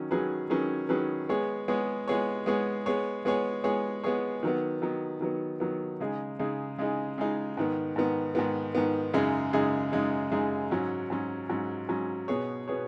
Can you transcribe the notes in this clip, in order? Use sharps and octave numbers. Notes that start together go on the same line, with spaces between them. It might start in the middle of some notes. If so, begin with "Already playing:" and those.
Already playing: D#3 F#3 C#4
D#3 F#3 C#4 G#4 B4
D#3 F#3 C#4 G#4 B4
D#3 F#3 C#4 G#4 B4
G#3 B3 G#4 C#5
G#3 B3 G#4 C#5
G#3 B3 G#4 C#5
G#3 B3 G#4 C#5
G#3 B3 G#4 C#5
G#3 B3 G#4 C#5
G#3 B3 G#4 C#5
G#3 B3 G#4 C#5
D#3 F#3 B3
D#3 F#3 B3
D#3 F#3 B3
D#3 F#3 B3
C#3 G#3 D#4 G#4
C#3 G#3 D#4 G#4
C#3 G#3 D#4 G#4
C#3 G#3 D#4 G#4
G#2 D#3 B3
G#2 D#3 B3
G#2 D#3 B3
G#2 D#3 B3
F#2 C#3 G#3 D#4 G#4
F#2 C#3 G#3 D#4 G#4
F#2 C#3 G#3 D#4 G#4
F#2 C#3 G#3 D#4 G#4
G#2 F#3 C#4
G#2 F#3 C#4
G#2 F#3 C#4
G#2 F#3 C#4
B2 B3 G#4 C#5
B2 B3 G#4 C#5